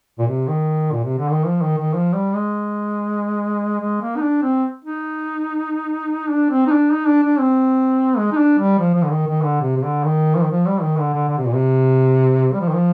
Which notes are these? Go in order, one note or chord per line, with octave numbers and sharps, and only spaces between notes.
A#2
C3
D#3
A#2
C3
D3
D#3
F3
D#3
D#3
F3
G3
G#3
G#3
A#3
D#4
D4
C4
D#4
D4
C4
D#4
D4
D#4
D4
D4
C4
G#3
D#4
D4
G3
F3
F3
D3
D#3
D#3
D3
C3
C3
D3
D#3
F3
D#3
F3
G3
D#3
D3
D3
D3
C3
A#2
C3
G3
F3
D#3
F3